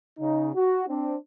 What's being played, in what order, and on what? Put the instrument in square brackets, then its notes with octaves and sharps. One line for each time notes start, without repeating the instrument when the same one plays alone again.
[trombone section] C#3 D#4
F#4
C4 D4